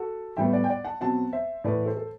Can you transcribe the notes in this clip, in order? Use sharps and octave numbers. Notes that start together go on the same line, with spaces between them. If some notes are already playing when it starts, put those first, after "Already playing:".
Already playing: F#4 A4
A2 G3 B3 E5 G5
D5 F#5
G5
D5 F#5
F#5 A5
B2 F#3 C4 F#5 A5
C5 E5
A2 E3 A3 B4 D5
A4 C5
A4